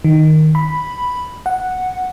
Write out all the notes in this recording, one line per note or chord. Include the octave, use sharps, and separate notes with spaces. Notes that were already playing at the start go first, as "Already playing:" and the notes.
D#3
B5
F#5